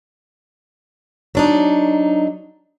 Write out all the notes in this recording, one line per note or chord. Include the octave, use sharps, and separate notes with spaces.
F#3 D4 D#4